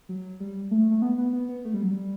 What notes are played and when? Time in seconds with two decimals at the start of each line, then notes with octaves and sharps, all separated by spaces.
0.09 F#3
0.40 G3
0.71 A3
0.91 A3
1.02 B3
1.18 B3
1.33 B3
1.49 B3
1.65 A3
1.74 G3
1.82 F#3
1.91 G3